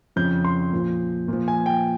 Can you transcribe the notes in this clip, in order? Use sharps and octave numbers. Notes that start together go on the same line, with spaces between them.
F2 C#3 F3 G6
C6
A#2 F3
A#2 F3
G#5
G5